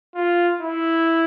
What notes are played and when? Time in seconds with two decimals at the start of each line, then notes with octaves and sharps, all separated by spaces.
0.15 F4
0.61 E4